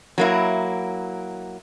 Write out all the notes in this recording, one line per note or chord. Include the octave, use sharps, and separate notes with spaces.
F#3 A#3 E4